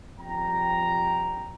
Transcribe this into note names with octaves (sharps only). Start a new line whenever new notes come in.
A#1 F2 G3 G5 A#5